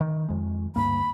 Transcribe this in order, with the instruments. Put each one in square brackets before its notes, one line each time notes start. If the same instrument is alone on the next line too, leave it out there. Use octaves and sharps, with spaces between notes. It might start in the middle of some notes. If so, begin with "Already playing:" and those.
[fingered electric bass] D#3
F2 G#3
[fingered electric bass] D2 G2 A#3 [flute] B5